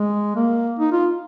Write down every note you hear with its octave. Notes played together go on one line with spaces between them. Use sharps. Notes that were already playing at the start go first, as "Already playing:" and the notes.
Already playing: G#3
A#3
D#4
F4